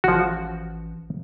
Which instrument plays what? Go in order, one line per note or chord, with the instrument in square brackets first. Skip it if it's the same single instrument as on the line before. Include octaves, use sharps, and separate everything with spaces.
[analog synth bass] A1 [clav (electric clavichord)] F3 F#4